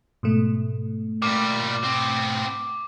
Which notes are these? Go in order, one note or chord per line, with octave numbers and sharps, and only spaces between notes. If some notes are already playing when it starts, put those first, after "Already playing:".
G#2 B2 A3
A#2 G3 D6
B3 C4